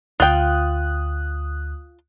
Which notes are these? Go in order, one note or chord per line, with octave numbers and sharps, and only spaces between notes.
D2 F4 G5 D#6 F#6